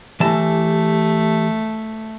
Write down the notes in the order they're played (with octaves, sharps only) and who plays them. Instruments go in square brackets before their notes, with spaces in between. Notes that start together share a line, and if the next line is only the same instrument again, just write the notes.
[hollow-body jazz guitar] E3 A5 [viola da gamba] A3 [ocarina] G4